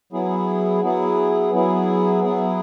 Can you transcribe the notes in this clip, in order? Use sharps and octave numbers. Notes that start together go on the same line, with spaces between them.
F#3 B3 E4 G#4
F#3 B3 E4 G#4
F#3 B3 E4 G#4
F#3 B3 E4 G#4